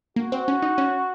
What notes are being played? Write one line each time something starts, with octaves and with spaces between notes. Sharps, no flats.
A#3 F#4
C4
C#4
D#4
C#4